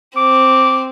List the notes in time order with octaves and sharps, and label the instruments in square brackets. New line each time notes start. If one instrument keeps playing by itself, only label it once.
[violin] C4 [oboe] D6